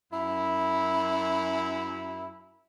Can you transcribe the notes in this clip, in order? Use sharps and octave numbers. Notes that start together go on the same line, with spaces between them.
F#2 E4